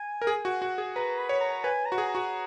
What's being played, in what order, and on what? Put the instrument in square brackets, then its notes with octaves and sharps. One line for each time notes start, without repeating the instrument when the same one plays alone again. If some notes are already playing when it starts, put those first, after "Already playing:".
Already playing: [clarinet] G#5
[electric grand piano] A#4
G#4
F#4
F#4
G#4
[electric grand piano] B4 [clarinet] A#5
[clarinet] B5
[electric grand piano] C#5
[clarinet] A#5
[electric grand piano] B4 [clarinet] G#5
[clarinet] A#5
[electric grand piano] F#4
G#4
[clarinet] A#5
[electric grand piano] F#4